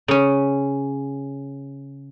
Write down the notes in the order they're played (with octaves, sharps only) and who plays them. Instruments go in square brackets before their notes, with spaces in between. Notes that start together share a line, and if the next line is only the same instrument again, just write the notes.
[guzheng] C#3 C#4